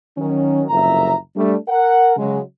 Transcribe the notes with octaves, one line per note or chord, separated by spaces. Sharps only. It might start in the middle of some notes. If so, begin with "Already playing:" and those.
D#3 F#3 C#4
F#1 C2 F2 E5 A#5
G3 A3 D4
A#4 F#5
C#3 F#3 G#3